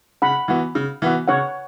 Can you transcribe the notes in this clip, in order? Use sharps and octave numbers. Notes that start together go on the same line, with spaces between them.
C#3 F#5 B5
E3 B3 F#4
C#3
E3 B3 F#4
C#3 C#5 F#5